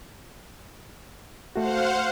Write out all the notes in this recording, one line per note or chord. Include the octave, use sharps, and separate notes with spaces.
A3 F#4 C5 F5 F#5